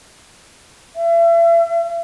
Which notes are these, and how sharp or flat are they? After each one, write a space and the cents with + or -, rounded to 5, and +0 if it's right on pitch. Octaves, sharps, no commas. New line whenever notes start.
E5 +35